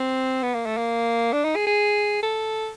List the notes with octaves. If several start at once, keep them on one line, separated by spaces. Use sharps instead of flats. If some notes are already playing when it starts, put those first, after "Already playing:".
Already playing: C4
B3
A#3
A3
A#3
D4
D#4
G#4
G#4
A4